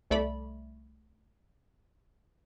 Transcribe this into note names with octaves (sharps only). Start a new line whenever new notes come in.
C2 A3 D5 B5